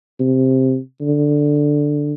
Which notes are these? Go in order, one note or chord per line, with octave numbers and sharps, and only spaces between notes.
C3
D3